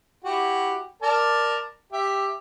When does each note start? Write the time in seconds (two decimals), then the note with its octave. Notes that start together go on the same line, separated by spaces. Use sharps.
0.25 E4 F#4 G4
1.03 A#4 D5 A5
1.93 G4 E5